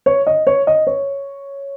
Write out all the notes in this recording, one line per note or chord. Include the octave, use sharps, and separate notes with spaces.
C#5
D#5
C#5
D#5
C#5